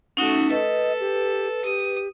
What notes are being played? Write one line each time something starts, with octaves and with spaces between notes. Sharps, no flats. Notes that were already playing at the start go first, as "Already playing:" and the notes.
A3 C#4 D#4 F#4
A4 B4 D#5
G4
G4 D#6